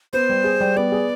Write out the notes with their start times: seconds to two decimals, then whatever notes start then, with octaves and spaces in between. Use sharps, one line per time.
0.13 B3 C5
0.29 G3
0.44 G#4
0.60 G3
0.76 B3 D5
0.92 G#4